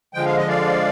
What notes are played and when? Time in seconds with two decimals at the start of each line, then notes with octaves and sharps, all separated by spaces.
0.14 D3 F3 G#3 G5
0.25 F5
0.37 D#5
0.48 D5 F5